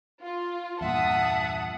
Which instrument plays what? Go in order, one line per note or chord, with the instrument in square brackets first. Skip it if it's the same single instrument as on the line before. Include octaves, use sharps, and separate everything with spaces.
[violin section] F4
[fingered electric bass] E2 G2 A#2 [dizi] E5 [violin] F#5 [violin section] A5 D#6